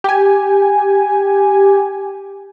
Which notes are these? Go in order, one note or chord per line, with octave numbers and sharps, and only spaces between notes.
G4 G#5